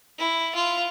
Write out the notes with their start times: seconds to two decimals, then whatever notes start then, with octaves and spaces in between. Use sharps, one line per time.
0.18 E4
0.55 F4